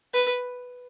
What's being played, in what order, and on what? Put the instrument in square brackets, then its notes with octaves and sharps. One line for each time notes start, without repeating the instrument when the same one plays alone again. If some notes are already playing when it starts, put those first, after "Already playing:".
[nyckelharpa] B4